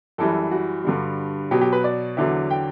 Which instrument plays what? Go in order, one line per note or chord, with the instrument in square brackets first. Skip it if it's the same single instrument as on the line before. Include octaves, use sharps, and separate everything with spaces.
[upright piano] F#2 E3 G3 A4
F#4
G2 D3 G3
B2 F#3 G4
G4
B4
D5
E2 D3 F#3 E5
G5